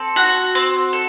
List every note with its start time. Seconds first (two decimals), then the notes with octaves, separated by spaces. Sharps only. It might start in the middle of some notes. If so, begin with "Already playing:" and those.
Already playing: C4 A4
0.16 F#4
0.55 C4
0.93 A4